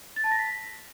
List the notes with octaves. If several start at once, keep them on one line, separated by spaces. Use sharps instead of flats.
A6
A5
A#6
B6